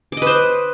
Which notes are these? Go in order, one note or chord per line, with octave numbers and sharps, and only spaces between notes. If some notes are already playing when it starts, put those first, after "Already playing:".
B4 C5 D#5 D6